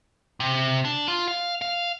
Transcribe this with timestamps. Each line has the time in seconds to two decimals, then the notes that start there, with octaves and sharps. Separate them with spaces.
0.40 C3
0.85 D4
1.08 F4
1.28 F5
1.62 F5